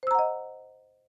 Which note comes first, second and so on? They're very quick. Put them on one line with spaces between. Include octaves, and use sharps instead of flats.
C5 E6 A#5 F#5 D#5